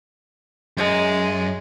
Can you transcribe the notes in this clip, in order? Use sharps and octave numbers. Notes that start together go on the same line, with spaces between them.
F#2 G#3